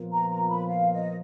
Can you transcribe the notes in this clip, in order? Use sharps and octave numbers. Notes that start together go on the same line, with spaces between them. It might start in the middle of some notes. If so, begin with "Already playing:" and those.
Already playing: A#2 F3 B3 F4 A#4
A#5
A#5
B5
F5
D#5